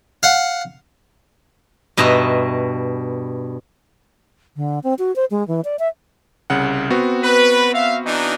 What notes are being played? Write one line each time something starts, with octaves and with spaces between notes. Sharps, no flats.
F5 F#5
G2 B2 D#5 E5 A#5
D3
C4
F#4
C5
G#3
E3
D5
E5
C2 C#3 F#5
B3 C4 F#4
B4
E5 F5
E3 D4 D#4